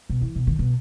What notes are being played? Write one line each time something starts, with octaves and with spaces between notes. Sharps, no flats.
B2
E3
B2
D#3
B2